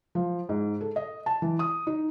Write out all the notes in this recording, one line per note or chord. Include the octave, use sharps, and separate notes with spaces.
F3
G#2
A4
D#5
A5
E3
D#6
D#4